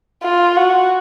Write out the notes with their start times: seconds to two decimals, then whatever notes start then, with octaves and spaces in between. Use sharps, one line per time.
0.23 F4
0.56 F#4